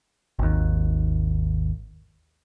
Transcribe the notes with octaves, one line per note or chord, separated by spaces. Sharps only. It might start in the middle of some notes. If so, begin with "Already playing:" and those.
G#1 D#2